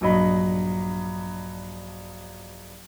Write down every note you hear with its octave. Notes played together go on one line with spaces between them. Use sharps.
A#1 G2 F#3 D#5 B5